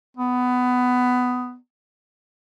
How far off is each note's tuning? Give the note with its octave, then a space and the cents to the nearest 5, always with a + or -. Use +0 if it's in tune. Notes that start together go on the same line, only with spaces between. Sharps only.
B3 +15